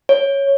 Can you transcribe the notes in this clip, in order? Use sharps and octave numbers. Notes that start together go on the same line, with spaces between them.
C#5